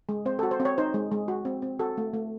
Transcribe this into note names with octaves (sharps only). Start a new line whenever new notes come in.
G#3
C4 C5
F#4 A4
C5
C4
C#5
D#4 C5
G#3
G#3
F#4
C4
C4
F#4 A4
A3
A3